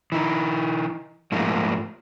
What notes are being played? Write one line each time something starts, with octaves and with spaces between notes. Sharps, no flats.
E3 D#4
G#2 F3 A3 A#3